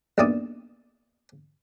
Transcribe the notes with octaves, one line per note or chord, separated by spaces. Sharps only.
B1 G2 A#2 E4 D5 D#6